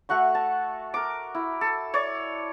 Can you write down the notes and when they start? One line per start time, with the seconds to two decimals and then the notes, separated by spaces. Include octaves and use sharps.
0.09 A3 F#4 F#5 C#6
0.35 A5
0.94 A#4 D6
1.35 E4
1.61 A4
1.94 C#5 D5